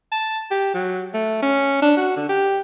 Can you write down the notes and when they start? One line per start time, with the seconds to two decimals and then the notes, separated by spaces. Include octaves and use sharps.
0.12 A5
0.51 G4
0.74 F#3
1.14 A3
1.42 C#4
1.82 D4
1.97 F#4
2.16 D3
2.29 G4